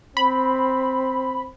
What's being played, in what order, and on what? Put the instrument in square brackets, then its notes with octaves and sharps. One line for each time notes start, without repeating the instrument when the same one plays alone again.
[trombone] C4 [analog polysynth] B5